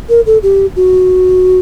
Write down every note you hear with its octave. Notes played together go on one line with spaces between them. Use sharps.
A#4
A4
G4
F#4